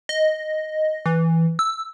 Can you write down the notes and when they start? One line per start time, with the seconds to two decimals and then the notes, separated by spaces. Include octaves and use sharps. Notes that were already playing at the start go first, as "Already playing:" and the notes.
0.09 D#5
1.06 E3
1.59 E6